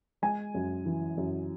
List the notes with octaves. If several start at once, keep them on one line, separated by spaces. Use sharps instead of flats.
G#3 G#5
F#2
E3
F#2